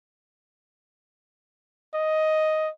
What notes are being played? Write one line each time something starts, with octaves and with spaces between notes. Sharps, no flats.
D#5